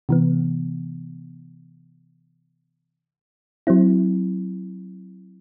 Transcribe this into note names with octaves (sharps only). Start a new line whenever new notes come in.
C3 E3 B3
F#3 C4 E4